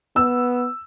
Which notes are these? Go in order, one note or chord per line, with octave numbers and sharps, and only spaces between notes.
B3 E6